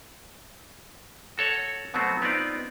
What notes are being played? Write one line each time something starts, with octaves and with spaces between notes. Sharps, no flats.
F#4 A4 C#5 F#5
B2 F#3 A3 B3 C4 F#4
B3 C4 D#4 F4 D5